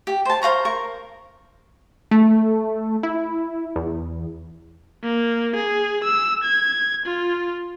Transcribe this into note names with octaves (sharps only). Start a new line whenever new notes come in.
G4
C5 A5
C5 F5 A#5 C#6
A#4 C#6
A3
E4
E2
A#3
G#4
E6
G#6
F4